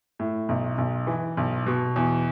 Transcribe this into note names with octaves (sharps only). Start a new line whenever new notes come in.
A2
B1
B1
E3
B1
B2
E2